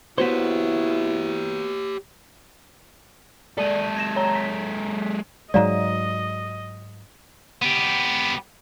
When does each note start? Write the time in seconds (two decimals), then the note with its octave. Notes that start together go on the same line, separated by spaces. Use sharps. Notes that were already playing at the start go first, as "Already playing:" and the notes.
0.18 B3 E4 F#4 G4 C5 C#5
3.57 G#3 A4 D5 A5 D#7
3.96 G#6 A#6 E7
4.16 C#5 A#5
4.35 B6
5.54 G#2 F#3 G#3 D5 D#5 F5 A#5
7.62 B3 G4